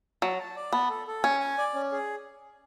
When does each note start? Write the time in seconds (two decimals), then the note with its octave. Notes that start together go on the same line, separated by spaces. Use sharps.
0.22 F#3 A5
0.40 A5
0.56 D5
0.72 B3 A5
0.89 A4
1.07 A4
1.23 C#4 G#5
1.40 G#5
1.58 D5
1.74 C#4
1.92 G#4